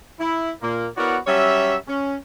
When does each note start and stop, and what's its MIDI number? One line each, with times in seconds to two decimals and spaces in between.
0.19 0.50 64
0.61 0.86 46
0.61 0.86 58
0.97 1.17 59
0.97 1.17 64
0.97 1.17 66
0.97 1.17 70
0.97 1.17 73
0.97 1.17 74
1.26 1.76 54
1.26 1.76 55
1.26 1.76 61
1.26 1.76 73
1.26 1.76 76
1.87 2.15 61